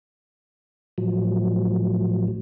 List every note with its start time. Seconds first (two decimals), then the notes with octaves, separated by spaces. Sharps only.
0.98 A2 F3 F#3